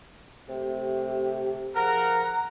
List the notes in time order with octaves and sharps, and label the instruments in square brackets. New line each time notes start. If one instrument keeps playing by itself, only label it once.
[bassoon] C3 [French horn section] A3 G4
[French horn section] F3 G#4 [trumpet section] A#4 F#5 [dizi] A#5